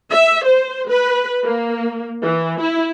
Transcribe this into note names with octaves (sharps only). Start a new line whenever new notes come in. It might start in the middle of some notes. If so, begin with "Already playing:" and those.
E5
C5
B4
A#3
E3
E4